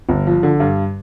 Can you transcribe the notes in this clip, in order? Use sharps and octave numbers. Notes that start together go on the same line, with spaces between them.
G1
F3
D3
G2